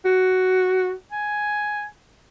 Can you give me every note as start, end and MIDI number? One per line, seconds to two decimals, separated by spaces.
0.05 0.91 66
1.12 1.85 80